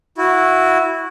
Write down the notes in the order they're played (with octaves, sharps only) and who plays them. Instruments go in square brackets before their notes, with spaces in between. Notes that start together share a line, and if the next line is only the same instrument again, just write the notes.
[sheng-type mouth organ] E4 F#4